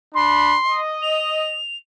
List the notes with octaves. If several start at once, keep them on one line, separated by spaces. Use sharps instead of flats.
D4 B5 C6
D#5
F7